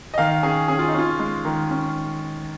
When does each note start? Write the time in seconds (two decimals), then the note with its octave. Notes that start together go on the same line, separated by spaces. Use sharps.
0.14 D#5
0.18 D#3 F5
0.43 C#4 G#4
0.68 C#4 G#4
0.79 F4
0.89 D#4
0.94 C#4 F4
1.19 G#3
1.45 D#3
1.71 C#4